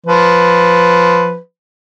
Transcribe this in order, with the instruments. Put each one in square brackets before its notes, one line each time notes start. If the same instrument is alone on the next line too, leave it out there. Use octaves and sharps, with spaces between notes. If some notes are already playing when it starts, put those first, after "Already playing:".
[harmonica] F3 B4